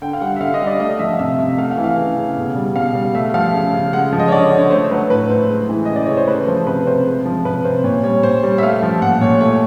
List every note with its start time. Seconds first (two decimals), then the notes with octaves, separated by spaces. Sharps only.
0.02 D3 G5
0.13 F5
0.21 G3 F#5
0.36 E5
0.40 D3 F5
0.54 D#5
0.60 G3
0.67 D5
0.80 A3 D#5
0.99 F3 E5
1.13 F5
1.19 C3 E5
1.39 C3
1.58 A3 F5
1.71 F5
1.77 E3
1.84 F5
1.97 C#3
2.17 C#3
2.37 B2
2.56 G3
2.76 B2 F5
2.95 G3
3.15 A3 E5
3.34 F3 F5
3.54 C#3
3.74 C#3
3.93 G#3 F#5
4.13 F3
4.19 D#5
4.28 C#5
4.32 D3 D5
4.45 C#5
4.51 D3
4.58 C#5
4.71 A3 C5
4.91 F#3 B4
5.10 A2 B4
5.30 A2 C5
5.50 G#3
5.69 E3
5.85 C#3 D#5
5.96 D5
6.06 C#3 C#5
6.17 C5
6.28 A3 B4
6.48 F3 C5
6.67 C3 B4
6.87 C3 C5
7.06 G#3
7.26 F3
7.45 C3 B4
7.65 C3 C5
7.84 A#2 C#5
8.03 G3 C#5
8.23 A#2 C5
8.43 G3 C#5
8.58 E5
8.63 A3 F5
8.83 F3
9.02 A#2 F#5
9.21 A#2 C#5
9.41 A3 C#5